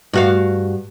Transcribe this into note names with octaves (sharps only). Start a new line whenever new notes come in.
G2 F#4 F5